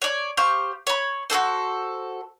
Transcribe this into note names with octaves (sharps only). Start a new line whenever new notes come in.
C#5 D5
G4 C5 F5 C#6
C#5 B5
F#4 G#4 A4 C5